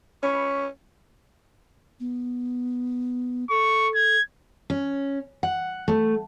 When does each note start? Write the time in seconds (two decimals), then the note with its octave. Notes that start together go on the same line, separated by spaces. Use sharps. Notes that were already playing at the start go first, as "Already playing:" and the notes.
0.23 C#4 B5 C#6
2.00 B3
3.50 A4 C#6
3.95 G#6
4.70 C#4
5.43 F#5
5.88 A3